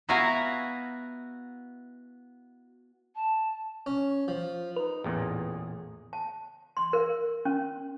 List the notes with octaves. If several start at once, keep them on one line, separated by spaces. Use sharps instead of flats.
B3 E4 F#4 F5 G#5 A#5
A5
C#4
F3
D#4 B4
A1 E2 A#2 G#4
A5
C6
A#4
C#4